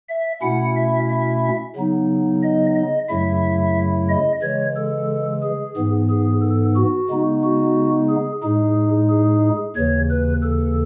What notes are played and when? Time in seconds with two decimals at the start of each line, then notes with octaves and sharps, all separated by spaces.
0.09 E5
0.42 B2 A3 C#4 E4 F#5
0.76 E5
1.09 E5
1.75 C#3 F#3 B3 D#4
2.43 D#5
2.75 D#5
3.08 F#2 C#3 F#3 A3 E4 E5
4.09 D#5
4.42 C#3 E3 G#3 C#5
4.76 A4
5.43 G#4
5.77 G#2 E3 B3
6.10 G#4
6.42 A4
6.76 F#4
7.09 C#3 G#3 B3 D#4
7.43 F#4
8.09 G#4
8.43 A2 G#3 D#4 G#4
9.10 G#4
9.76 D#2 C#3 E3 C#5
10.10 B4
10.43 A4